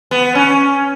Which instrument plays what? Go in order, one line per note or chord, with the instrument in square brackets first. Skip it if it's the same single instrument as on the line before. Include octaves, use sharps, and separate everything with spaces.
[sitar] B3
C#4